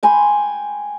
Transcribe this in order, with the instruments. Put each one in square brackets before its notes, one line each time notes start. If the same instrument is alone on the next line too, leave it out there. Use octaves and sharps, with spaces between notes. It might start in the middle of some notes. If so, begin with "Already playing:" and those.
[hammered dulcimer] G5 G#5 B5 C6